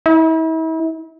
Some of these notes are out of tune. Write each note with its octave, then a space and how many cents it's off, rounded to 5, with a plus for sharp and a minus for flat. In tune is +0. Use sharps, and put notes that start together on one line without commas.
E4 -40